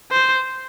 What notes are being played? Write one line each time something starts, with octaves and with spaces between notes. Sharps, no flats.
C5